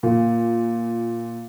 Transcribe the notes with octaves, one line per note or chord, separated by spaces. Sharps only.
A#2